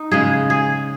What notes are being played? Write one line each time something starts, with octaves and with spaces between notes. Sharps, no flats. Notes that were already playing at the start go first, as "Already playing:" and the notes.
Already playing: D#4
C#3 G#3 G#4
G#4